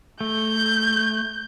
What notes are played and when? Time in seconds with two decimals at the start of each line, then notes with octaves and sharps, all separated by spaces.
0.21 A3 G6